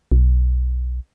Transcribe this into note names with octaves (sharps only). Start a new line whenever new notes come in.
B1